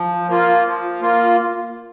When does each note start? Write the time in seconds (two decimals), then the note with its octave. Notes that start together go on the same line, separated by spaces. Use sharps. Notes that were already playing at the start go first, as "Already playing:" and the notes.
Already playing: F3
0.28 A#3 F4
0.64 F3
1.01 A#3 F4